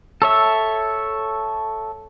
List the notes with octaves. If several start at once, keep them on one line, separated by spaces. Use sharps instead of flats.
A4 C#5 E5